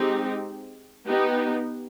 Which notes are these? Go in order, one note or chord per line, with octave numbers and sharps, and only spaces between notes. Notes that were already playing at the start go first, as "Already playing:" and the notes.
Already playing: G#3 C4 D#4 G4
B3 D#4 G4